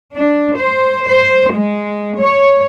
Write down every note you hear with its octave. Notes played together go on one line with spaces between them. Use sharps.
D4
C5
C5
G#3
C#5